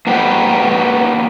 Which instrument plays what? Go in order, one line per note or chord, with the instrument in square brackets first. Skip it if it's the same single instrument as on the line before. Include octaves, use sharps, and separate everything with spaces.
[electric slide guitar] A#3 B3 D#4 G4 B4 C5